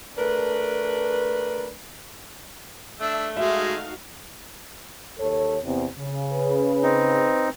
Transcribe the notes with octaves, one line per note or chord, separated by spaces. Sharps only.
A3 D4 A#4 B4
A3 D4 E5 E6
G#3 D#4 F#4 E5 F5
D#2 A4 C#5
E2 C3
C#3
B4
C4 D#4